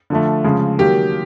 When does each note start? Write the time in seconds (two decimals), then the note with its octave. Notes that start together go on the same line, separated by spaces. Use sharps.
0.10 D3 F3 A3
0.44 C#3 F3 G#3
0.79 D#3 F#3 A#3 G4